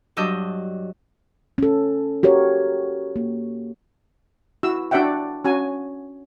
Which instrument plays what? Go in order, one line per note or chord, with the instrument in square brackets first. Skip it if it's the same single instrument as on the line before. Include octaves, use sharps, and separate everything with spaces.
[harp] G2 F#3 D4 D#5 E6 G6
[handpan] C#4 A4
F#4 G4 A#4 C#5
A#3
[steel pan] E4 F#4 E6
D4 F#4 D5 E5 F#5 G5
C#4 F#4 G#5